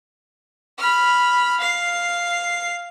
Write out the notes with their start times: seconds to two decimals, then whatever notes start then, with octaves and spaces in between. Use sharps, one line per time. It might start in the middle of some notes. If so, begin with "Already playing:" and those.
0.79 B5 F6
1.60 F5 C7